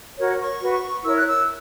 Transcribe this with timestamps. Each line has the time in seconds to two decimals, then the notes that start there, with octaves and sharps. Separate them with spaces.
0.18 F#4 A#4 C#5
0.39 C#6
0.61 F#4 B4
1.03 E4 A#4 C#5 E6
1.15 F#6
1.27 E6